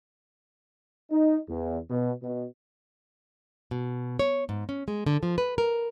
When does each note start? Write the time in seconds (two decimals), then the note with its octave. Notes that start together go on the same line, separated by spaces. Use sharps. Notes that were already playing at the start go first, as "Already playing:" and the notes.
1.11 D#4
1.49 E2
1.90 B2
2.23 B2
3.71 B2
4.19 C#5
4.49 G#2
4.69 C#4
4.88 G#3
5.06 D3
5.23 F3
5.38 B4
5.58 A#4